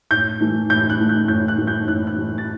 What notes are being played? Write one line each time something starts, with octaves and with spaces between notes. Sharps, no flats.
A2 G6
E3 A3
A2 G6
F#6
E3 A3
G6
A2 G6
F#6
E3 A3
G6
A2 F#6
F#6
E3 A3
A6